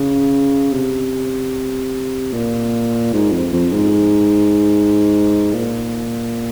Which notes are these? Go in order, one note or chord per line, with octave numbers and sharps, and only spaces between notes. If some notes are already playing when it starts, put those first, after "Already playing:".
Already playing: C#3
C3
A#2
G#2
F2
F2
G#2
A#2